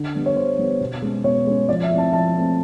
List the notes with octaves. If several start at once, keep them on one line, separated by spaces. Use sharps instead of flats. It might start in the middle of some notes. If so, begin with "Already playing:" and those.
Already playing: D3
G3 B3 D4
C#5
D3 C5
G3 B3 D4
B2
G#3 C#4
B2 C#5
G#3 C#4
F3 D5
E5
A3 C4 E4
A5
F3 A5
A3 C4 E4